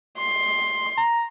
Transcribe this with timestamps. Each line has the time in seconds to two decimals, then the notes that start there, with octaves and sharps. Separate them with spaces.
0.19 C6
0.97 A#5